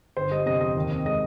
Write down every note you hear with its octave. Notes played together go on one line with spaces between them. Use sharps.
G1 C5
G3 D#5
C3 D#5
F2 D#5
D#2
C4
G#3 D#5